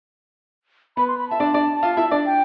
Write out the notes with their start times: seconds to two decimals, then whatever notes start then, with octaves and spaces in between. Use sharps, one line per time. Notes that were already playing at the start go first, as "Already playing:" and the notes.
0.97 B3 B4 B5
1.08 C6
1.18 B5
1.29 E5 A5
1.40 D4 D5
1.54 D4 D5
1.83 F4 F5
1.97 E4 E5
2.11 D4 D5
2.26 G5